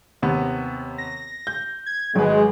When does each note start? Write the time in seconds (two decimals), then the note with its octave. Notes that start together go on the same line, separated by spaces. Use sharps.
0.22 D#2 C3 B3
0.98 A#6
1.47 G6
1.86 G#6
2.16 G#1 F#3 G#3 B4